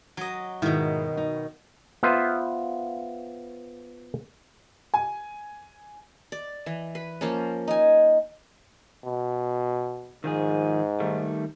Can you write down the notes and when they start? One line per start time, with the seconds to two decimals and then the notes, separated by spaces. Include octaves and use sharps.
0.17 F#3 D#5
0.62 G#2 B2 D#3 E4
1.17 D#4
2.03 B3 F4 B4 C5 E5
4.94 G#5
6.32 D5
6.66 E3
6.95 B4
7.21 F3 A#3 C#4
7.68 D#4 G#5
9.06 B2
10.24 G#2 D#3 F3 G#4
11.00 D#3 G3 A3